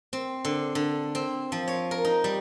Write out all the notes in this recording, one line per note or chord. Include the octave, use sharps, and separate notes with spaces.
C4
D3
D3
C4
F3
C#5
A#4
D#4
G3